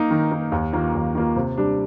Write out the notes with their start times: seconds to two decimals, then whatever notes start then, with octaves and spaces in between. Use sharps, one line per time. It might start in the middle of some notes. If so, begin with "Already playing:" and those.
Already playing: A#3 D#4
0.11 D#3
0.31 A#3 D#4
0.52 D#2
0.73 D#3 A#3 F4
0.95 D#2
1.15 D#3 A#3 F4
1.36 C3
1.58 G3 D4